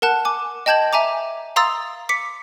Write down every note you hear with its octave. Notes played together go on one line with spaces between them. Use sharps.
A#4 F#5 A5 F#6
G#5 D6
D#5 G5 A5 G6 G#6 F#7
E5 G#5 A#5 D6
F5 A#5 C6 D#6 E6 A6
D6 B6 C#7